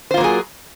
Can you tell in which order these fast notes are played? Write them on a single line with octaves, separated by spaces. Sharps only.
C5 F4 A#3 F#3 G#4